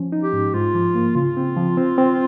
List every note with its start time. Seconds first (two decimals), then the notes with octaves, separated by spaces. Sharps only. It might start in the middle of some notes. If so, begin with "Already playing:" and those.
Already playing: F3 C#4
0.12 D#4
0.23 G4
0.33 G#2
0.54 G#2 F4
0.75 F3
0.95 A#3
1.15 C#3 F4
1.37 C4
1.57 F3
1.77 C4
1.98 C4